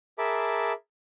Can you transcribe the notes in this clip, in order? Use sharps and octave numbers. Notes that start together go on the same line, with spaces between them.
G#4 A#4 E5 A5 B5 D6